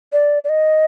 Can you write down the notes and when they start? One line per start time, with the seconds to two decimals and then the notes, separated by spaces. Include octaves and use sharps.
0.13 D5
0.44 D5
0.49 D#5